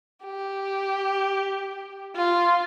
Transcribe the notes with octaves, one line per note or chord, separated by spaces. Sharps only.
G4
F4